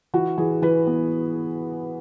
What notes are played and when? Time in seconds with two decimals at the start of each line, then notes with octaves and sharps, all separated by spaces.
0.14 E3 F#4
0.38 E3 G#4
0.62 E3 B4
0.87 B3